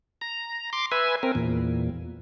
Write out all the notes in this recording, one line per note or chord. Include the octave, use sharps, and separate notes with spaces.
A#5
C6 D6
B4 E5 G#5
C4 A#4
E2 A#2